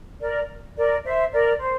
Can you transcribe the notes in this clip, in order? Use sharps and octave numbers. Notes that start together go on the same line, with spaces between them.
A#4 D5
A#4 D5
C5 E5
A#4 D5
C5